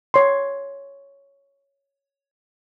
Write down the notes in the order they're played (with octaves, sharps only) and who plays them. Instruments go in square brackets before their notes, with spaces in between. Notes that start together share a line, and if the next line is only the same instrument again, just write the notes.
[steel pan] C#5 C6